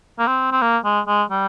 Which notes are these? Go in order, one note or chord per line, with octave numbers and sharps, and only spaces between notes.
A#3
C4
C4
A#3
G#3
G#3
G3